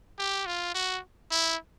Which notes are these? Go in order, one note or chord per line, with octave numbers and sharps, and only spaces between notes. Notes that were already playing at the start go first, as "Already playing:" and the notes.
G4
F4
F#4
E4